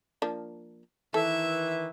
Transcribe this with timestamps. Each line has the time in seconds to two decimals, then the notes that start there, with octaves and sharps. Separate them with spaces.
0.22 F3 A#3 D4
1.14 D#3 E3 A4 E5